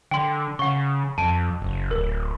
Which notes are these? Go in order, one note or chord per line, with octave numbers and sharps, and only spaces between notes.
D3 G5 C6
C#3 F#5 C#6
F2 A5 D7
F#1
D1 A#4